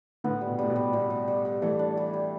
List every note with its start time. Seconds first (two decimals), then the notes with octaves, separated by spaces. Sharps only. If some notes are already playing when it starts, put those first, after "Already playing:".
0.24 A2 D3 B3
0.41 G3
0.47 B2
0.59 A2 G3
0.70 B2
0.76 G3
0.93 B2 G3
1.10 G3
1.28 G3
1.45 G3
1.62 E3 G3 A3
1.79 D4
1.97 G3
2.13 G3